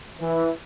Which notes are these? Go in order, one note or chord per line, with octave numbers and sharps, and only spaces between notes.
E3